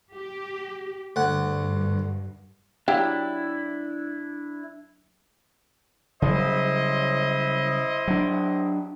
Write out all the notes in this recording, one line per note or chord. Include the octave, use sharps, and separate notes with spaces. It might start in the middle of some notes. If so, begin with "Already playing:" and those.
G4
D2 G2 F#5
F#3 D4 E4 G4 F5
C#3 F#3 G3 E4 C5 D#5
F#3 D4